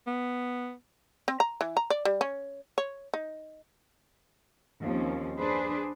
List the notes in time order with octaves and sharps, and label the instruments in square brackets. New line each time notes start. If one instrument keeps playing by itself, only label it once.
[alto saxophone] B3
[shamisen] C4
A#5
E3
A#5
D5
G3
C#4
C#5
D#4
[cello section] D#2 F3 C4 C#4
D4 G#4 B4 C5